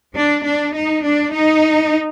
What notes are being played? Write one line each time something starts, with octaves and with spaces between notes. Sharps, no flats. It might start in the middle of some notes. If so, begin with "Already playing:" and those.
D4
D4
D#4
D4
D#4